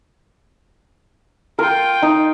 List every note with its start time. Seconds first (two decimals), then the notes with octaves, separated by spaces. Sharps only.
1.59 F4 A#4 G5
2.02 D#4